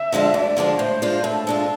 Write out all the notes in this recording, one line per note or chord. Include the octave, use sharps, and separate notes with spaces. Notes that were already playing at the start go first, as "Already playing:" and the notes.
Already playing: E5
D3 F3 G#3 D4
D2 D5
D3 F3 G#3 D4
A2 C5
G#3 D4 F4
A2 A4
G#3 D4 F4